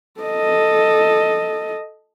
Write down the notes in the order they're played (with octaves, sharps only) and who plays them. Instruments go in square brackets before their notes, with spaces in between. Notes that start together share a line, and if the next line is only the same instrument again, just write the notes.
[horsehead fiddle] A4 D#5